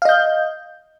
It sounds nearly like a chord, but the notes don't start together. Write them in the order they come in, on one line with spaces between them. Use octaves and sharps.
F5 D#5 G6